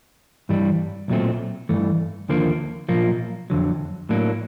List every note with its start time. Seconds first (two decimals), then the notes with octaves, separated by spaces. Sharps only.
0.49 G2 E3 G3
1.08 B1 A#2 F#3 A3 C4
1.69 G2 E3 A3
2.29 D#2 D3 F3 A#3
2.89 B1 A#2 F3 A#3
3.50 F2 D3 F#3
4.09 A2 F#3 A#3 D4